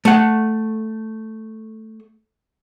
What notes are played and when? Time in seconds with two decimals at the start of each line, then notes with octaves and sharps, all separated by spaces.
0.05 A3 F#5